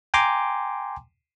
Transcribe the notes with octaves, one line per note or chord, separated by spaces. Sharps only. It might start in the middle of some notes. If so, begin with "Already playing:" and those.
G5 G#5 A#5 C6 D6